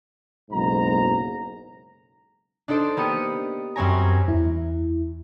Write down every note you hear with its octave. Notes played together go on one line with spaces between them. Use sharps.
F#1 B1 G#2 A#5
D4 D#4 A4 C5 D5
A#3 B3 G4 D#6 C#7
F#2 G3 C4 C#5 G#5 A#5
E2 E4